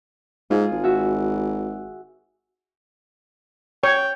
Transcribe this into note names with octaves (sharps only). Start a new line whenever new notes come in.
G#2 F4 G#4
G#1
F#4 E5
C#5 G5